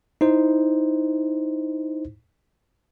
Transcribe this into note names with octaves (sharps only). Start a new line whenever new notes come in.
D#4 E4 C5